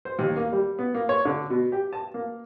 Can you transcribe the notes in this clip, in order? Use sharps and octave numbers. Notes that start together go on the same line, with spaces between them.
C5
D#2
A#3
G3
B3
A#3
C#5
D3
B2
G4
A5
A#3